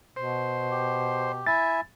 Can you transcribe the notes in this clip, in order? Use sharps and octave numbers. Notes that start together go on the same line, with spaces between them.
B2 C5
G4
E4 E5 G#5 A6